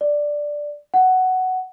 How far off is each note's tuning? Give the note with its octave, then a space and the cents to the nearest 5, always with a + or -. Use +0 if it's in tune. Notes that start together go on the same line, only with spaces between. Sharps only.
D5 +0
F#5 +10